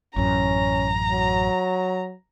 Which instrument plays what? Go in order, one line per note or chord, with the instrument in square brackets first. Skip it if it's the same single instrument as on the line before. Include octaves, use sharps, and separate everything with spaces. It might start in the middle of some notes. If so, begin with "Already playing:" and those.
[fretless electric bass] A1 F#2 [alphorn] C#4 [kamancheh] A#5
[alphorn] F#3